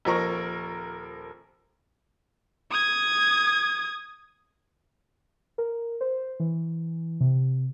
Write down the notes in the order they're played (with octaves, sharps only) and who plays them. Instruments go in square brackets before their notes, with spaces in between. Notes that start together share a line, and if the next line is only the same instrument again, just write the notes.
[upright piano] D#1 F3 A#4 C#6 A#6
[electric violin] D#6 G#6
[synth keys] A#4
C5
E3
C3